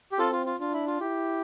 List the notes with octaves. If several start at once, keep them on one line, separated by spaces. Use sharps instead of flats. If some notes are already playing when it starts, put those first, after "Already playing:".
G4
C4 F4 A4
F4
F4
D4 F4
E4
F4
E4 G4